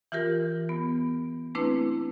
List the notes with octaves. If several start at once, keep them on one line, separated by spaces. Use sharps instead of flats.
E3 F4 G4 A#4
B3
A3 A#3 C4 D4 E4 B4